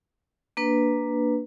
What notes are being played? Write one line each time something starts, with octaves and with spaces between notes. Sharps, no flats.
A#3 D4 B4